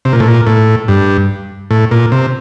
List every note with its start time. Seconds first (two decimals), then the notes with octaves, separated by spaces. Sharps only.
0.05 C3
0.13 A#2
0.20 A2
0.28 A#2
0.47 A2
0.88 G2
1.71 A2
1.91 A#2
2.12 C3